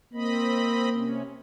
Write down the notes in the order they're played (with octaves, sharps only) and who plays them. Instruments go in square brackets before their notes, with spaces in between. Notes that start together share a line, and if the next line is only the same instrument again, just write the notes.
[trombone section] A#3 [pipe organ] C4 D#5 B5
[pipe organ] C3 C#4